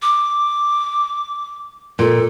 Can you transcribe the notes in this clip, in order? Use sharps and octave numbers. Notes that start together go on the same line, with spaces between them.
D6
A#2 A4